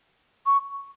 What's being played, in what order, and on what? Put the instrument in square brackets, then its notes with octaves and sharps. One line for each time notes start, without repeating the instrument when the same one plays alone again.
[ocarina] C#6